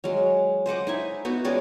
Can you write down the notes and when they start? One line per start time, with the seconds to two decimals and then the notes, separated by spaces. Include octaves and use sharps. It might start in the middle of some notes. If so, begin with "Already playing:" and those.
0.04 F#3 G#3
0.66 C5 D#5 F#5 D6
0.87 D#4 E4 G#5
1.25 B3 D#4 F#4
1.45 G#3 C#4 G#4 D5